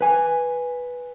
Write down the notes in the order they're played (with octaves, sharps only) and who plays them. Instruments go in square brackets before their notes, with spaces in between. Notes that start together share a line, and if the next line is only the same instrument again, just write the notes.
[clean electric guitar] B4 G#5